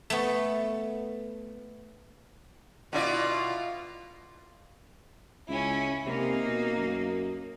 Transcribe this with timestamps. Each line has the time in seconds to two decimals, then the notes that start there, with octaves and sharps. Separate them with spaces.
0.10 A3 B3
2.93 B2 E4 F4 D5
5.49 C#2 C#4 E4
6.06 C3 A#3 D#4
6.46 B2
6.77 F#2